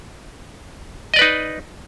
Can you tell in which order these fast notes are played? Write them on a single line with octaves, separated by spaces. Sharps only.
D#5 D5 B4 D#4